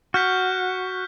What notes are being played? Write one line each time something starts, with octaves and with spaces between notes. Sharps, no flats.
F#4 F6 G6 B6